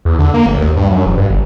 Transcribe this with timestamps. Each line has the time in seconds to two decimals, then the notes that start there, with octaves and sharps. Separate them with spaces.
0.05 E2
0.19 D3
0.34 A#3
0.46 G1
0.58 D#2
0.76 G2
0.91 F#2
1.06 E1
1.17 G2
1.30 G1